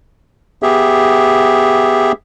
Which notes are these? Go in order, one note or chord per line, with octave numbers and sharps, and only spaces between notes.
B3 G4 G#4 E5